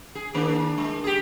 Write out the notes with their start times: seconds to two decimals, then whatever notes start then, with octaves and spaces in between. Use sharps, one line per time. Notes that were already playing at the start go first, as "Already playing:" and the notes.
0.15 G#4
0.34 D#3 A#3 D4
0.78 G#3
1.04 G4 G#4